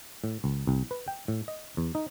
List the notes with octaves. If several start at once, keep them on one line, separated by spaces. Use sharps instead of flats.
A2
C#2
C2
B4
G5
A2
D#5
E2
D#4